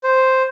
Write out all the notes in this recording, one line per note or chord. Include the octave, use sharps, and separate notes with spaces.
C5